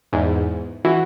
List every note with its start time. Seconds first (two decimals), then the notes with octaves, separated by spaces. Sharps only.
0.13 E2 G#2
0.85 E3 F#4